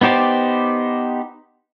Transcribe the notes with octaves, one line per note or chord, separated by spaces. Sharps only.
B3 D#4 G4 C5 D5